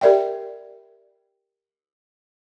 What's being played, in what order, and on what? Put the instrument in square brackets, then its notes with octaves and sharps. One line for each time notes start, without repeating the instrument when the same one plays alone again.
[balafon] G4 A#4 D5 E5 G5